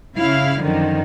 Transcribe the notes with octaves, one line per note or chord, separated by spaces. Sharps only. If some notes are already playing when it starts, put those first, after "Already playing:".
C#3 E4 F5
F#2 D3 D#3 F3